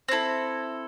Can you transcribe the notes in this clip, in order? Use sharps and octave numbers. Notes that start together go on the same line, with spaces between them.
C4 E4 A4